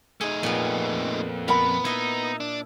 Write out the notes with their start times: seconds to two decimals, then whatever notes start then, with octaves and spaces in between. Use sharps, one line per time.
0.21 A3 D#4 G#4
0.43 F2 A#2 B3
1.48 B3 A#4 F#5 A#5 B5
1.85 B3 D#4 E4 D#5
2.40 D4